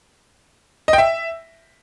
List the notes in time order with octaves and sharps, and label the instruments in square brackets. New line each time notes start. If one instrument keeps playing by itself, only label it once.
[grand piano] D#5
G5
E5